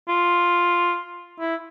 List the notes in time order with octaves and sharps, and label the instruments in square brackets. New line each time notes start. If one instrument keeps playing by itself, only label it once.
[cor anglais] F4
E4